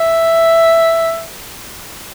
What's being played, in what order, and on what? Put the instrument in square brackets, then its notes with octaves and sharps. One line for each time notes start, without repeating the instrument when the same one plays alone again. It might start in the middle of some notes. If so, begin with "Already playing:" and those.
Already playing: [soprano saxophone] E5